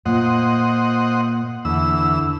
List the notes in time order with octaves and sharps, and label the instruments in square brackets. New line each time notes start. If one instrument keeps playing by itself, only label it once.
[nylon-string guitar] A#2 [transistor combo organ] C5 D#5 F#5
[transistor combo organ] E2 E6 [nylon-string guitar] D3